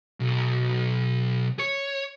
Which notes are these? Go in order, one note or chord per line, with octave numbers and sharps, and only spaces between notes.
B1
C#5